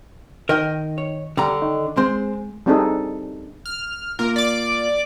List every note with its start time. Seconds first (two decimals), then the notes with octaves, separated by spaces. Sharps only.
0.49 D#3 A#4 D#5 G5
0.98 C#5
1.37 D3 G3 A#5
1.62 D#3
1.97 G#3 C4 C5
2.66 G3 C4 D4 D#4 G#4 A4
3.66 F6
4.19 A#3 F4 A#4
4.36 D5 D6